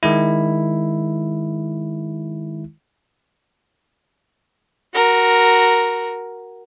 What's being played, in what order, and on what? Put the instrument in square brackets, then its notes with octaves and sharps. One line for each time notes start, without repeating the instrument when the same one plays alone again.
[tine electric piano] D#3 G#3 E4
[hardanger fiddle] F#4 A#4